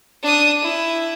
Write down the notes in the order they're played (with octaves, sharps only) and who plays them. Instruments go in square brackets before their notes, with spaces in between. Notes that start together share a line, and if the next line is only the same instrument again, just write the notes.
[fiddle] D4 D#6
E4